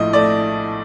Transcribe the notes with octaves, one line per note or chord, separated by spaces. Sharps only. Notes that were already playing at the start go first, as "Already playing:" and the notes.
Already playing: A#1 A2 F3 D#5
A3 D5